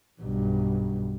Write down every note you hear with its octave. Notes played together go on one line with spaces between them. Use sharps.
B1 G2